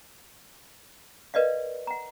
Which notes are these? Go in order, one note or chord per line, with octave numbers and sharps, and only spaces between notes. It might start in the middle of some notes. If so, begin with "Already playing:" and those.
A#4 B4 D5 D#5 F5
F#5 A#5